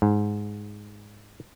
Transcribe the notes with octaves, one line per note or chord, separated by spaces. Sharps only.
G#2